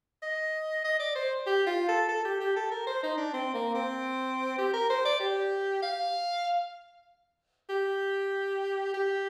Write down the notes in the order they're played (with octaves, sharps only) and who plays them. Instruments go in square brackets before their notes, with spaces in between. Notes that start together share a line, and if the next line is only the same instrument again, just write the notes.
[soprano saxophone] D#5
D#5
D5
C5
G4
F4
A4
A4
G4
G4
A4
A#4
C5
D#4
D4
C4
A#3
C4
G4
A#4
C5
D5
G4
F5
G4
G4